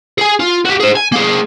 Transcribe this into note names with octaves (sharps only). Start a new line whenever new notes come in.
G#4 G#5
F4
F#4 G4
G#4 C5
G#5
A#3 G#4